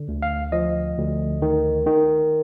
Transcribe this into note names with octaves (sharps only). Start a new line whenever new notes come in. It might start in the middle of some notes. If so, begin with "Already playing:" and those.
Already playing: D3
D2
F5
F3 D#5
D2
D#3
D#3